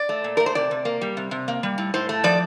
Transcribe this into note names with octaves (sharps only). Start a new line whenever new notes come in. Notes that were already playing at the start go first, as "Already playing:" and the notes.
Already playing: D5
A3
A#2
A3 A#4
C5
C3 D5
C3
A#3
G3
C3
C3
A#3
G3
A2
A2 C5
A3
F3 D5